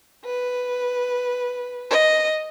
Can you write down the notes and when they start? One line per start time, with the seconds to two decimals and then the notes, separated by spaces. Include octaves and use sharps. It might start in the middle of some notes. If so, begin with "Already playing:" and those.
0.25 B4
1.90 D#5